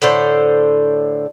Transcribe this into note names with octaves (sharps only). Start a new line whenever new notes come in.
A2 D3 A4 C5